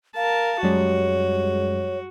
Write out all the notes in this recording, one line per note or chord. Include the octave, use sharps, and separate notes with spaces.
A#4 F5 A5
F#2 G3 G#3 F#4 C#5